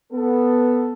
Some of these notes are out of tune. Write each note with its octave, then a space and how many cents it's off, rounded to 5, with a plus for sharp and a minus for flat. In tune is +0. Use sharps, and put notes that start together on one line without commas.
B3 +0 A4 +0